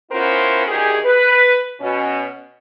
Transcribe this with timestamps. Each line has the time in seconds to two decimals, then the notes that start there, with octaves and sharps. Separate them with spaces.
0.11 B3 C#4 E4 F4 A#4 C5
0.67 D2 D#3 G4 G#4
1.04 B4
1.80 B2 C#4